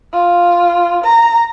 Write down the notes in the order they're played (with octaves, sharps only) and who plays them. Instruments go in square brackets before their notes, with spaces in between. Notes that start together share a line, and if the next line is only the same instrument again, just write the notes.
[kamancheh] F4
A#5